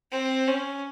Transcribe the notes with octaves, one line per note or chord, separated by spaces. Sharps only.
C4
C#4